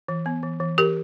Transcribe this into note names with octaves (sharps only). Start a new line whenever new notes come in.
E3
B3
E3
E3
E3 G4 A#4